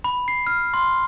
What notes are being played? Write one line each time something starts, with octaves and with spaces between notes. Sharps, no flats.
B5
C7
F6
C6